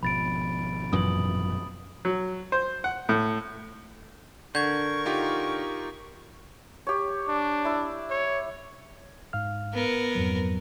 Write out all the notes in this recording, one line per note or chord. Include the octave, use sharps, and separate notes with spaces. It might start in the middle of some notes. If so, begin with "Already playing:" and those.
G#1 B2 F3 B5 A6 D7
F#2 A#2 E3 D#6 F#7
F#3
C5
F#5
A2
D3 A#4 C#6 G6 G#6
D#4 F4 G4
G4 C#5
D4
E4 D5
C#5
G#2 F5 F6
B3 A#4
F2 G#2 F#3